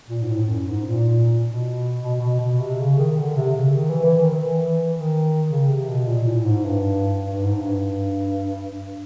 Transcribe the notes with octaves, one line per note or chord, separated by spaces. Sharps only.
A#2
G#2
A2
F#2
G#2
A#2
B2
B2
B2
B2
C3
C#3
D#3
D3
C3
C#3
D#3
E3
E3
D#3
E3
D#3
C#3
C3
B2
A#2
A2
G#2
G2
G2
G#2
G2